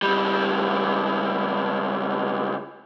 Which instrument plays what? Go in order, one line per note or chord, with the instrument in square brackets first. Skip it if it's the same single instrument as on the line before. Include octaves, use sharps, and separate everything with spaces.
[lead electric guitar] C#2 G3